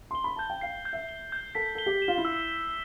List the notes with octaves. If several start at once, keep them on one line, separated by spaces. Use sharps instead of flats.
C6 G7
B5
A5 G6
G5
F5 C7
G6
E5
G7
G6
A4 B6
A4 G7
G4
E7
F4
E4
E6
B6